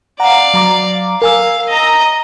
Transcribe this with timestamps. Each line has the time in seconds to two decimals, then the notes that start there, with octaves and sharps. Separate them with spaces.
0.20 D5 F5 F#5 A#5
0.54 F#3 A#5 D6
1.22 A#4 F5 G#5 E6
1.68 D#5 A#5